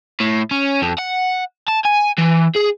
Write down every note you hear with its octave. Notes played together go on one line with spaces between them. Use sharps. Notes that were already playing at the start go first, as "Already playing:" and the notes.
A2
C#4
F2
F#5
A5
G#5
E3
G#4